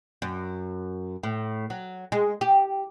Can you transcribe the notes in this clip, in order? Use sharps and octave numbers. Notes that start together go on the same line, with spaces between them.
F#2
A2
F#3
G#3
G4